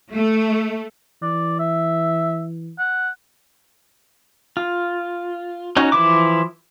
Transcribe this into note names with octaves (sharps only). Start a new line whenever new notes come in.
A3
E3 D5
E5
F#5
F4
C#4 D#4 F#4
E3 F3 E4 D6